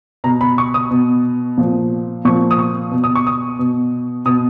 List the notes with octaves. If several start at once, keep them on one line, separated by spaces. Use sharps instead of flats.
B2 A#5
B5
C#6
D#6
B2
A#2 F3
A#2 F3 C#6
D#6
C#6
B2
D#6
C#6
D#6
B2
B2 D#6